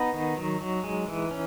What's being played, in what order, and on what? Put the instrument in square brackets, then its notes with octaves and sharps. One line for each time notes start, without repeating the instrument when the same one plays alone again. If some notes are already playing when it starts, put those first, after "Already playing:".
Already playing: [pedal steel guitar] B3 D#4
D#3
F#3
F#3
G#3
E3
C#4